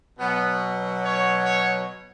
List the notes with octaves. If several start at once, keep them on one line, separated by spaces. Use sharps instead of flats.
B2 F#3 B3
C#5
C#5